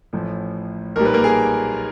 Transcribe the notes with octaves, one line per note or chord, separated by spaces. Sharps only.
A1 A2 F3
B1 A#2 G3 A#4
B4
A#3 A#4
G#4